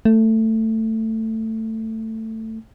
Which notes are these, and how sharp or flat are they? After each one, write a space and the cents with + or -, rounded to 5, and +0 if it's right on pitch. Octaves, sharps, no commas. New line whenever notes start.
A3 +15